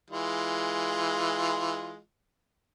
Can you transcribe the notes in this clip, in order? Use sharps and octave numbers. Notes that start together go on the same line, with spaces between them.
E3 G#3 F4